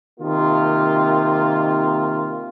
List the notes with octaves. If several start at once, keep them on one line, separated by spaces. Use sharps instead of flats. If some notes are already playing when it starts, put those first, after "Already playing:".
C3 D#3 A#3 F4